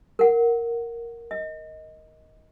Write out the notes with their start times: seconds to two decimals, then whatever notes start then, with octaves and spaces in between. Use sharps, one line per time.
0.19 A#4 F#5
1.31 D#5